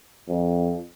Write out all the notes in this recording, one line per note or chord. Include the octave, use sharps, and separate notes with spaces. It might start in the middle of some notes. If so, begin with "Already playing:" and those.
F2